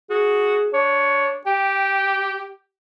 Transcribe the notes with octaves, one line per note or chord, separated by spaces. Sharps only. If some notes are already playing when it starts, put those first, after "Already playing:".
F#4 G#4
D4 C#5
G4 G5